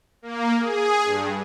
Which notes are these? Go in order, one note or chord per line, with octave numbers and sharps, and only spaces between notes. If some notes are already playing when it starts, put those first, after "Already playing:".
A#3
G#4
G2